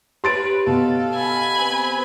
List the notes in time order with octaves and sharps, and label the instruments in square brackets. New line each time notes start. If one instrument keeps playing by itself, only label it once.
[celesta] G4 [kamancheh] B4 C#5 [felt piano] C6 A6 D7
[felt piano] B2 [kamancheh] A4 F5
[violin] G#5 B5
[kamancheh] B3 C4